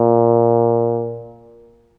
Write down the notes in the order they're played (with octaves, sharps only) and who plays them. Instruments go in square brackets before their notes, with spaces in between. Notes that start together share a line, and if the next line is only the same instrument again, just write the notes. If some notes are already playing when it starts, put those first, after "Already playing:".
Already playing: [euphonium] A#2